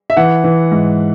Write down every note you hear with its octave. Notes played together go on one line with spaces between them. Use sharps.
E5
E3 F#5
E3
G#2